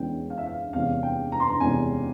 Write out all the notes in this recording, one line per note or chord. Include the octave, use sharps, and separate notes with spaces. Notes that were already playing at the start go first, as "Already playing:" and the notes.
Already playing: E2 E3 G#3 C#4 G5
F5
E5
F5
E2 C3 E3 G#3 C#4 F5
G5
A#5
C6
A#5
E2 C3 E3 G#3 C#4 G#5